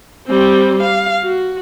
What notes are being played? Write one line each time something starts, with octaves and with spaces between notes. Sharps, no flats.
G3 C4
F5
F#4